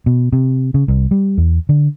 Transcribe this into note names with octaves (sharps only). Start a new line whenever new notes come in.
B2
C3
C#3
C2
G3
E2
D3